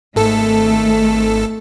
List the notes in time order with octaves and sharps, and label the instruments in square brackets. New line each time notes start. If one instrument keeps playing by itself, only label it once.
[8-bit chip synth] G#1 A4 [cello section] A3